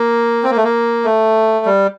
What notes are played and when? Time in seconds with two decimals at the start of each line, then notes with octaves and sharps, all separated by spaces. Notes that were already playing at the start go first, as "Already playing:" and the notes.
Already playing: A#3
0.43 C4
0.50 A#3
0.57 A3
0.64 A#3
1.05 A3
1.66 G3